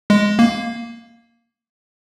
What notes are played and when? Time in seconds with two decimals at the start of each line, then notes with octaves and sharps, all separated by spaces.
0.10 G#3
0.39 A#3